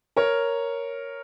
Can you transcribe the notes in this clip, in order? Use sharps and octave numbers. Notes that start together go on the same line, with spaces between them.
A#4 C#5